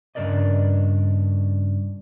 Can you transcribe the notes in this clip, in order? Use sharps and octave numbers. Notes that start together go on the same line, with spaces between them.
G2 C#3 D4 A#4 D5 D#5